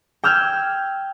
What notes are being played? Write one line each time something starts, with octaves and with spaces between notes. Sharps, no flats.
G5 E6 F6 G6 G#6